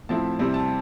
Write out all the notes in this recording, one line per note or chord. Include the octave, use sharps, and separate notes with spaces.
A2 F3 C4 E4 A5
C3 G3 C4 E4
A5